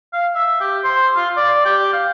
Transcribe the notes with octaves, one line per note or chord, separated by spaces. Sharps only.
F5
E5
G4
C5
F4
D5
G4
F5